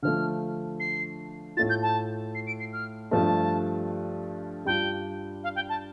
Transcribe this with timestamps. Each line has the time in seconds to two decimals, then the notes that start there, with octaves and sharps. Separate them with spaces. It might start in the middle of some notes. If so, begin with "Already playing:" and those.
0.03 D3 F3 A3 F6
0.80 C7
1.57 A2 A3 F4 A6
1.69 G6
1.82 A5
2.35 C7
2.47 D7
2.60 C7
2.73 F6
3.11 G2 F3 A3 A5
4.65 G2 G3 D4 F4 G5
5.43 F5
5.55 G5
5.69 A5